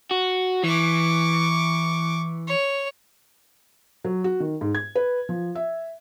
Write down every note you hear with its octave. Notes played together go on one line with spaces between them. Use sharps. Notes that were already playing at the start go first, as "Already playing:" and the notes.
F#4
E3 C#6 D6
C#5
F#3
F#4
D#3
G#2
G#6
B4
F3
E5